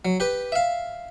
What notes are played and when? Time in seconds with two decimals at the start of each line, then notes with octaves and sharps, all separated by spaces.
0.05 F#3
0.20 G4 B4
0.52 E5 F5